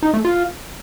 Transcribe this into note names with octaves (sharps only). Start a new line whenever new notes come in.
D#4
A3
F4